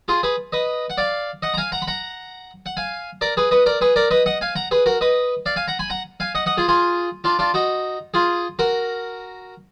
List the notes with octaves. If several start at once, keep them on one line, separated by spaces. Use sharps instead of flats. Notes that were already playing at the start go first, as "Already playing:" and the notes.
F4 G#4
G#4 B4
B4 D#5
F#5
D5 F5
D#5 F#5
A#5
F5 G#5
F#5 A#5
B5
F#5 A#5
F#5
F5 G#5
A#4 D5
G#4 B4
B4 D#5
A#4 D5
G#4 B4
A#4 D5
B4 D#5
D#5 F#5
F5 G#5
F#5 A#5
G#4 B4
F#4 A#4
B4 D#5
D5 F5
F5 G#5
F#5 A#5
G#5 B5
F#5 A#5
F5 G#5
D#5 F#5
D#5 F#5
F4 G#4
F4 G#4
D4 F4
D4 F4
D#4 F#4
F4 G#4
F#4 A#4